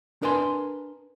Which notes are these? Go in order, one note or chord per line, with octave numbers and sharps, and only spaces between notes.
D4 A#4 B4 G#5 C6